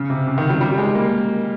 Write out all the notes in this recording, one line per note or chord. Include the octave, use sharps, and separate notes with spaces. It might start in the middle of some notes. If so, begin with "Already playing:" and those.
Already playing: C#3
C3
C#3
D#3
G3
G3
G#3
A#3